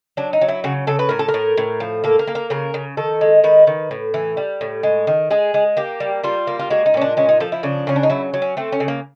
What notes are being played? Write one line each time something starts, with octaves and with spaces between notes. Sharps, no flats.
F#3 D4
D#4
F#3
E4
C#3 F#4
C#3 A4
B4
A2 A#4
A4
A#4
A2
A2
F3
A#3 A4
A#4
A#3
A#4
C#3 A#4
C#3
D#3 A4
G#3
D#3 B4
D#3
A2
E3
G3
A2
G#3
D#3
G#3 G#4
G#3
A#3 G4
G3
G3 F4
A#3
F4
G#3 F#4
D#4
A#2 C#4
D4
G#3 C#4
D#4
F3 A4
E4
C#3 D4
C#3 C#4
D4
D#4
F#3 E4
F#3
C#4
A3 C4
C#4
C#3
A#3